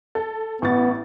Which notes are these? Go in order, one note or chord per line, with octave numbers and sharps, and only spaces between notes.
A4
A1 B3 C#6 A6